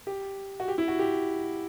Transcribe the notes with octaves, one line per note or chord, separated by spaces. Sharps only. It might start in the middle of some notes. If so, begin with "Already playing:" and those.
G4
F#4
G4
E4
F#4
G4